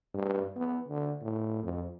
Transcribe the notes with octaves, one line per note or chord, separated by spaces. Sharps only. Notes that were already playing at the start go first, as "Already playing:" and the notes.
G2
B3
D3
A2
F2